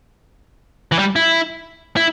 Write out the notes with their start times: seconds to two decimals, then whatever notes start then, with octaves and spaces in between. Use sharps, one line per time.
0.92 E3
0.99 G3
1.16 E4
1.97 E4